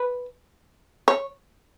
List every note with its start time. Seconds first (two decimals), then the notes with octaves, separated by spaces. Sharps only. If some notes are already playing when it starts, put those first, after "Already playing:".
Already playing: B4
1.08 C#5